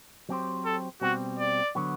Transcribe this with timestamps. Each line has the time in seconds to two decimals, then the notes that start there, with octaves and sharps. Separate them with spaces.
0.29 F#3 C4 G4 C5
0.65 A4
1.01 B2 G3 C4 F#4
1.39 D5
1.75 D3 F#3 B3 F#4